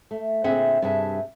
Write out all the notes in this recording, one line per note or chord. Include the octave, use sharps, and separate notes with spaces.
A3
A#2 D3 C4 G#4 E5 F#5
G2 C3 G#4 E5 A5